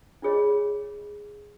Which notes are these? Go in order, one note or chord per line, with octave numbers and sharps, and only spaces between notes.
D4 F4 G#4 C#5 D#5